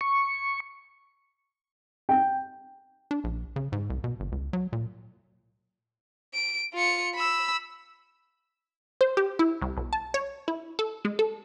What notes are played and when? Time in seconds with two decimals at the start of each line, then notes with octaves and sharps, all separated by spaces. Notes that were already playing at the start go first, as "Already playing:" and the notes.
0.01 C#6
2.09 G5
3.11 D4
3.24 A#1
3.56 C#3
3.72 G#2
3.90 C2
4.04 B2
4.20 G1
4.32 C#2
4.53 F#3
4.73 A#2
6.34 D7
6.74 F4 C#7
7.15 B5 E6
9.01 C5
9.17 G4
9.39 E4
9.62 C2
9.77 B1
9.93 A5
10.14 C#5
10.48 E4
10.79 A4
11.05 G#3
11.19 A4